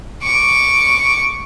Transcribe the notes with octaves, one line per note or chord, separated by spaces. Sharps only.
C#6 D6